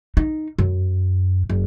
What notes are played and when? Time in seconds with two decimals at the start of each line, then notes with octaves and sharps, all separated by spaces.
0.17 D#4
0.58 F#2
1.50 F#1